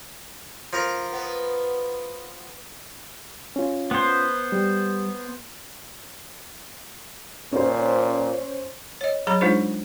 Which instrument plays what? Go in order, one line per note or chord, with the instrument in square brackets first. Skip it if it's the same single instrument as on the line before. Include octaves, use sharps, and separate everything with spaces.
[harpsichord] F3 A#4 A#5
[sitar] B3
[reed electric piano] C#4 F4
[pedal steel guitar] B3 C5
[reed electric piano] G3
[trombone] A#2 [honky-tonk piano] C#4 C5
[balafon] C#5 D#5
F#3 G#4 C#5 A#5 B5
G#3 D4 D#4 F4 G#4 C5